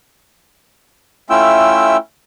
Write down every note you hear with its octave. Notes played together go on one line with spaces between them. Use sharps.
A3 C#4 E4 F4 G5 E6